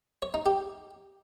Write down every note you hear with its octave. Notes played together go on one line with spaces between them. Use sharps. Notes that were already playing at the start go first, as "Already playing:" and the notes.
C#5
D#4
G4